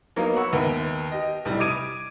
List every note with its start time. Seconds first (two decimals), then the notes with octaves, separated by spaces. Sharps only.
0.16 F#3 A#3 B3 D#4 A#4 F5
0.36 F#5 B5 C#6 E6
0.53 D#2 B3 A#4 E5
1.11 G4 D#5
1.45 B1 A2 C3 G3
1.60 D6 D#6 G#6 D7 D#7